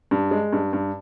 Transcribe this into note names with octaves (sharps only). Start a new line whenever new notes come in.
G2
G#3
G2
G2